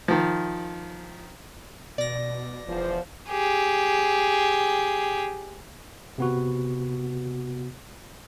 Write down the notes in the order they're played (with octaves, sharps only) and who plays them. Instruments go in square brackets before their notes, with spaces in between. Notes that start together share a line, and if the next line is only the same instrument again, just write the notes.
[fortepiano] D#3 F3
[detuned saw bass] B2 [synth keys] D5 A#6
[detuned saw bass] E1 [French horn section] E2 F3 C5
[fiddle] G4 G#4
[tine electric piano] C3 B3 F#4